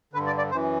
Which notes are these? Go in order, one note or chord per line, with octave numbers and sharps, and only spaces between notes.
G2 D3 B4
D5
D5
F#2 E3 C5